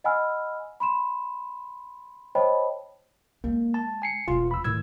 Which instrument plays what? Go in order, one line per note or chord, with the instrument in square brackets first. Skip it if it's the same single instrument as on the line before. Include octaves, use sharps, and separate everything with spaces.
[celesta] D#5 F#5 G#5 B5 E6 F6
B5 C6 E7
C5 C#5 D#5 G5 A5 B5
[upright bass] G#3 [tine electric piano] A#3
[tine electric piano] A5
G#5 C7 C#7
[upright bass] E1 A3 [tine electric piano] F4
[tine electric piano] B5 E6
[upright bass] A2 D#3 [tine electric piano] E6 G#6